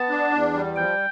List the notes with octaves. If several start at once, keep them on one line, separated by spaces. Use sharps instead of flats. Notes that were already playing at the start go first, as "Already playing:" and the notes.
Already playing: B3 A5
D4
E2
G3
F3 G5